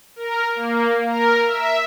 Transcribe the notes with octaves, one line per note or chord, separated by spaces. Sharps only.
A#4
A#3
A#4
E5